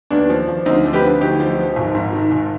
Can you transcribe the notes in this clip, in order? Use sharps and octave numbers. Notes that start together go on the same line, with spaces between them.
D#2 B3 D4
F3
F3
D2 C4 D#4
F3
G4 B4
D3
D2 D#4 G4
F3
F3
G#1
G#2
D#3
G#1